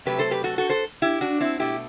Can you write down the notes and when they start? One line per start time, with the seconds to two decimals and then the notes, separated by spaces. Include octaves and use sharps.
0.05 C3 F#3 A3 G4 B4
0.19 A4 C5
0.31 G4 B4
0.44 F#4 A4
0.58 F#4 A4
0.69 A4 C5
1.02 E4 G4
1.21 D4 F#4
1.40 C4 E4
1.59 B2 A3 E4 G4